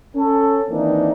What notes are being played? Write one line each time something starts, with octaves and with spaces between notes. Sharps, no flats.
C#4 A4
D#3 E3 A#3 C4 D4 D#4